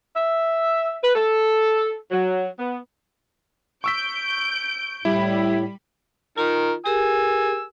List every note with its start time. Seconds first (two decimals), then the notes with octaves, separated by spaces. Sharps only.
0.16 E5
1.03 B4
1.16 A4
2.11 F#3
2.59 B3
3.84 C#6 E6 G6 B6 D7
5.05 A2 G3 E4 B5
6.38 D#3 F4 A#4
6.86 G4 G#4 A#4 G#5 E6